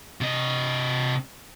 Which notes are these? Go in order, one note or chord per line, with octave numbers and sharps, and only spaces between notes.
C3 D#5